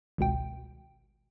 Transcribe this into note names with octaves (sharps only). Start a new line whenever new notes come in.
G#1 C#2 B2 G5